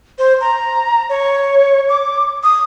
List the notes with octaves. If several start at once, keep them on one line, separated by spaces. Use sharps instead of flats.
C5
A#5
C#5
D6
D#6